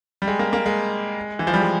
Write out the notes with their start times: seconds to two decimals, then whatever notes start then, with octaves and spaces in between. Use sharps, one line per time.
0.22 G3
0.28 G#3
0.39 A#3
0.53 A#3
0.66 G#3
1.39 E3
1.47 F3
1.54 G3
1.61 G#3